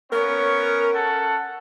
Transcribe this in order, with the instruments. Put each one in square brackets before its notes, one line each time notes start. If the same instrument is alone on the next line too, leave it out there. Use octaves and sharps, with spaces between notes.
[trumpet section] B3 C#4 C#5 [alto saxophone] A#4
[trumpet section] C#4 A4 F#5